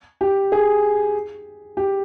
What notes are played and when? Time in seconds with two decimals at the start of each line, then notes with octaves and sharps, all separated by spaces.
0.21 G4
0.52 G#4
1.77 G4